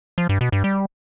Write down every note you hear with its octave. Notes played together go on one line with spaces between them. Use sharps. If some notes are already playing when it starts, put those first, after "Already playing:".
F3
G2
B2
G2
G3